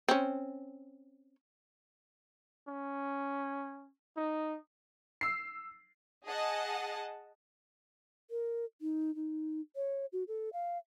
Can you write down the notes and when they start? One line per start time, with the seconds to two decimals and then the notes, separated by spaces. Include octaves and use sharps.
0.09 C4 C#4
2.67 C#4
4.17 D#4
5.21 E6 C7
6.27 G#4 D#5 F#5 A5
8.31 A#4
8.81 D#4
9.15 D#4
9.76 C#5
10.13 F#4
10.28 A4
10.53 F5